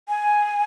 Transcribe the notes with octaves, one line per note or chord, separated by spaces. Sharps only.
G#5